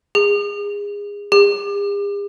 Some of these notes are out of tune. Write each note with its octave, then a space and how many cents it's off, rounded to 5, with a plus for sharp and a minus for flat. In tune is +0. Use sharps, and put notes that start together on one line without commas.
G#4 -25
G#4 -45